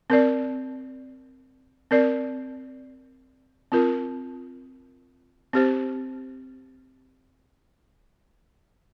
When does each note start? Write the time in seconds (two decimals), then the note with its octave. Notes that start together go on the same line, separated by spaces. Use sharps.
0.10 C4 A#4 D5
1.91 C4 A#4 D5
3.72 C4 F4 A#4
5.53 C4 G4 C5